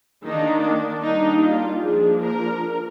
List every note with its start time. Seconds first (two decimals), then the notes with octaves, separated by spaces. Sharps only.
0.24 D#3 A#3 D4 D#4
0.63 D4
1.03 G3 A#3 D4 D#4
1.42 F4
1.82 F3 A#3 D4 G#4
2.21 A#4